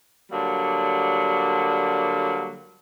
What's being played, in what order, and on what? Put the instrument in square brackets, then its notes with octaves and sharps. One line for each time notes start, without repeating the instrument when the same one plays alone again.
[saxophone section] D3 F#3 G3 A#3